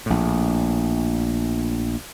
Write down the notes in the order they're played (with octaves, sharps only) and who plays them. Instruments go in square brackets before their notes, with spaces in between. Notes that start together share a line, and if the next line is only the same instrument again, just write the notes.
[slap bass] A#1 A2